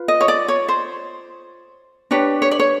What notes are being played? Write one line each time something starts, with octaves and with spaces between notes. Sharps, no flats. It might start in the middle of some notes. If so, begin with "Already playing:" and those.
Already playing: F4 B4
D#5
C#5
D5
C#5
C5
D4 G4 B4 C#5
C#5
D5
C#5